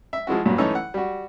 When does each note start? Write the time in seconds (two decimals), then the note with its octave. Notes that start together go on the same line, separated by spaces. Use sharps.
0.13 E5
0.27 F3 G#3 E4 F#4
0.46 G2 A#2 F#3
0.58 E3 A3 C#4 D#4
0.75 F#5
0.94 G3 F#4